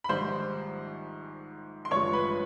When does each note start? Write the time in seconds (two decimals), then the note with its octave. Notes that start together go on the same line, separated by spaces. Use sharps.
0.04 B5
0.09 A#1 G#2 D#3 G3 C5 C6
1.85 C6
1.91 A1 G2 D3 F3 G#3 C#5 C#6
2.13 B4 B5